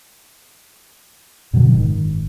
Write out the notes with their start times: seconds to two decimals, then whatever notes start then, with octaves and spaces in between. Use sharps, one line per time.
1.53 F#2 B2 D3 F#3
1.72 F#1 G#2 D#3